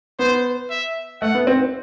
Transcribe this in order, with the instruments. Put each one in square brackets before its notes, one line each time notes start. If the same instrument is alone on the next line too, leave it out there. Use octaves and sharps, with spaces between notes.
[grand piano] B3 [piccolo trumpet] C5
[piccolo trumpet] E5
[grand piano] A3 [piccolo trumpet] F#5
[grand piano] B3
C4